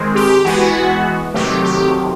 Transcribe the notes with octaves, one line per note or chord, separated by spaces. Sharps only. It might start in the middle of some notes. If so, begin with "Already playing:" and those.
Already playing: D#3 G#3 C4
G4
E3 G#3 B3 F#4
C3 D#3 F#3 A3 C4 G4
G4